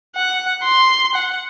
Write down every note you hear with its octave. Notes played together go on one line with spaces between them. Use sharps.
F#5
C6
F#5